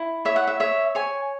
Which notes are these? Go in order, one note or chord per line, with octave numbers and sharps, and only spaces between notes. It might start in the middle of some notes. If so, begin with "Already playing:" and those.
Already playing: E4
C#5 E5
F#5
E5
C#5 E5
C#5 G#5